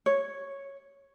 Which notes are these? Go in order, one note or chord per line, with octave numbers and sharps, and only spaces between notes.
C#5